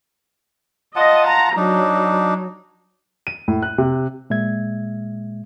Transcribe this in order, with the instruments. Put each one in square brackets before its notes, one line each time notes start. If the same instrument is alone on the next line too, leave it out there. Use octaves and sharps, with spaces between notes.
[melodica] F4 F#5 A5 [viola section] D#5
[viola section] A#5
[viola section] F#3 [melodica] D4 D#4
[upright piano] D#7
A2
F#6
C3
[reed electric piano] A#2 G#3 E5 G#6